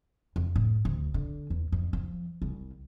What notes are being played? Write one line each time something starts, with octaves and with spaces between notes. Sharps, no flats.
F2
A2
D2
D3
E2
F2
F3
C2